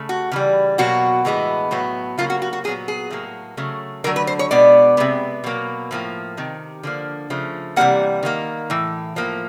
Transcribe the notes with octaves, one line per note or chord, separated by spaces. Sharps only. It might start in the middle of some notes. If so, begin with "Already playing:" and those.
Already playing: C#3 A3
F#4
C#3 E3 G3
B2 F#3 A#3 F#4
A2 E3 G#3 B3
A2 F#3 B3
C#3 F#3 A#3 F4
F#4
F#4
F#4
A#2 F#3 B3 G#4
G#4
A2 F#3 A#3
C#3 F#3 A3
D3 F#3 A3 A#4
B4
C5
C#5
B2 G#3 B3 D5
C3 D#3 G#3 B3
B2 F#3 A#3
A2 F3 A#3
C3 D#3
D3 F3 A#3
C#3 F3 A3
C3 E3 G3 A#3 F#5
D#3 G3 A#3
A2 E3
A2 F3 A#3